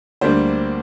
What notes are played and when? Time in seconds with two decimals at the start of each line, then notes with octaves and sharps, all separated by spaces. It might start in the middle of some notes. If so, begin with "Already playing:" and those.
0.21 D2 D3 G3 A#3 D4 C5